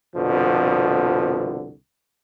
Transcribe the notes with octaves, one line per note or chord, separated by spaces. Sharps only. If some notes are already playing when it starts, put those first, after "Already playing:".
C2 F2 B2 D3 F3